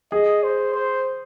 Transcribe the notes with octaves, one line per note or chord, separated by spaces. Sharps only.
G#4 D#5
C5
C5